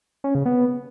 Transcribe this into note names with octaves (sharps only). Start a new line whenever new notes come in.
C#4
C#3
B3